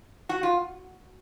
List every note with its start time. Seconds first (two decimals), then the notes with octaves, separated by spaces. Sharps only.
0.29 F#4
0.43 F4